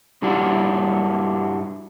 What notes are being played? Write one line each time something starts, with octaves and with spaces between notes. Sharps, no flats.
G2 G3 D4 E4 F#4